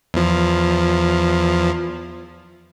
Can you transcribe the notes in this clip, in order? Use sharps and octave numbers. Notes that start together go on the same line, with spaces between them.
E2 F3